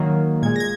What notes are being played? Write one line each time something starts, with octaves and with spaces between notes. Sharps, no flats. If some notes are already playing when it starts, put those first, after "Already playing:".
Already playing: D#3 F#3 A#3
A#2 G#3 G#6
A#6
G#6